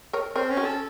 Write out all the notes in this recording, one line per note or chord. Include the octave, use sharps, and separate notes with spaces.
A#4 C#5
C4 A#4 C#5
C#4
F#4 A#4
A4